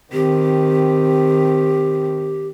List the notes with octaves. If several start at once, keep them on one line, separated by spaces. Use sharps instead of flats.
D#3 C4 G4